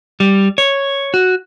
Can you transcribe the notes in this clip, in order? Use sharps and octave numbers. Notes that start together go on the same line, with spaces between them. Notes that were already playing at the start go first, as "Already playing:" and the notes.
G3
C#5
F#4